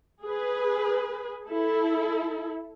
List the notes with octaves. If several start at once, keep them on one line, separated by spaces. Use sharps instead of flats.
G#4 B4
E4 A4